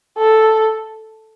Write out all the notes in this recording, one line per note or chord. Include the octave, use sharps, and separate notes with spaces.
A4